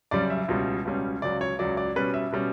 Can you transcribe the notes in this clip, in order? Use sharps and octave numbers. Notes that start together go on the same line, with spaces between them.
F#2 C#3 G3 C#4 D5
E5
C#2 B2 G3 C#4
C#2 B2 G3 C#4
C#2 C#3 F#3 D5
C#5
C#2 C#3 F#3 D5
D5
B2 G3 C#4 B4
E5
B2 G3 C#4